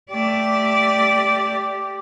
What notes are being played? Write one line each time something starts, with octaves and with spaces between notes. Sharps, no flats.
A3 G4 D5